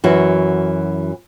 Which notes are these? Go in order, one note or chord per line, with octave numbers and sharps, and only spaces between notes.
F#2 E3 F#4